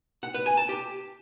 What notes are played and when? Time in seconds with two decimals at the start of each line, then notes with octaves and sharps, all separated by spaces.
0.23 F#5
0.34 B4
0.46 G#5
0.57 A5
0.69 G4